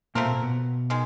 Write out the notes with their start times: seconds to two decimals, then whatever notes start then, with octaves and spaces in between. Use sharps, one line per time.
0.15 A#2 A3 A#3 C4 F4 A#4
0.25 B2 B3
0.35 A#2 A#3
0.43 B2 B3
0.90 D#3 G#3